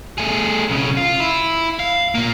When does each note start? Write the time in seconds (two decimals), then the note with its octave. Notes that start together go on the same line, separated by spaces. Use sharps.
0.18 A3 G#4
0.70 B1 C#3
0.97 F4
1.20 E4
1.79 F5
2.15 A#2 A#3